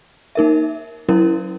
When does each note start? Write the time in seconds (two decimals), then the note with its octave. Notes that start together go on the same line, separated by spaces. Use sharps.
0.35 A#3 D#4 A#4 E5
1.08 F#3 C#4 E4 A#4